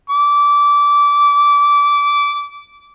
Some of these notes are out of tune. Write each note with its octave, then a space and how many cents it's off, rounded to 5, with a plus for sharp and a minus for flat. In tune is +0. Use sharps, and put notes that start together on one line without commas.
D6 -20